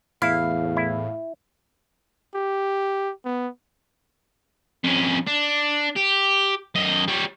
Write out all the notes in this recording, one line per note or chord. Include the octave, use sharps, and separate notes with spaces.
E2 A2 E4 F5
E4
G4
B3
F2 C#4
D4
G4
F#2 D#5
G3 C#5